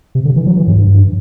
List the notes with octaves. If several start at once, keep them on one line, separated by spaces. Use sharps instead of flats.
C3
D3
E3
F#3
E3
G2
G2